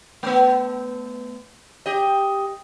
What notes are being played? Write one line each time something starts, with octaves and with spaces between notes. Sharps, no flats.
A3 B3
G4 D#5